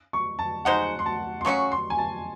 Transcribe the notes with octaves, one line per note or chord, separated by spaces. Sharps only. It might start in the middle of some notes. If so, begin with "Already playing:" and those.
C#6
A5
G#3 D#4 G#4 C5 F#5
C6
A5
C6
C#3 F#3 C#4 F#4 C#6
C6
G#5
A5